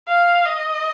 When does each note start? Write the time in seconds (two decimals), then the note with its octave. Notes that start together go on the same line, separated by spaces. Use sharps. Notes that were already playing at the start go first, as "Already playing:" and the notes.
0.08 F5
0.46 D#5